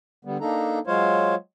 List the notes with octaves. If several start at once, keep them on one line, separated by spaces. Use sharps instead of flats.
D3 G3 B3
A#3 D4 D#4 A4 A#5
F#3 G#3 F4 C5 C#5 F5